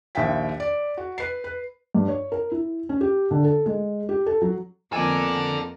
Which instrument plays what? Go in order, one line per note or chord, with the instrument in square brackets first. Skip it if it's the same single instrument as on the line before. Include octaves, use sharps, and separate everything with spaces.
[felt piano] A#1 D#2 E5 F5 G5 B6
D5
F#4
B4 C7
B4
G2
C#5
A#4
E4
C#4
G4
D3
A4
G#3
G4
A4
F#3
[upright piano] F2 F3 [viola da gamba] A#3 B3 A#4 [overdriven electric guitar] A4 D5 [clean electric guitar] G#5